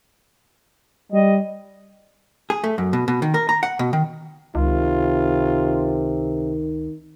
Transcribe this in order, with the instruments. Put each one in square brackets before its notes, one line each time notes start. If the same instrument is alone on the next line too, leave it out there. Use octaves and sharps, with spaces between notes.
[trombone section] G3 [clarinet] D#5
[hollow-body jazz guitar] G#4
A3
F#2
B2
B2
D#3
A#4
A#5
F#5
B2
D#3
[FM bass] C#2 [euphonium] C3 [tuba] D#3 [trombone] F4